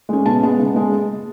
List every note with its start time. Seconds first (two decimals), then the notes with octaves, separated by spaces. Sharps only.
0.09 G#3 C#4
0.26 B2 A5
0.43 G#3 B3 A5
0.59 C#3
0.76 G#3